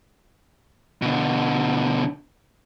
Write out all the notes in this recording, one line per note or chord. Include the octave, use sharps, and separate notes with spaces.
B2 D3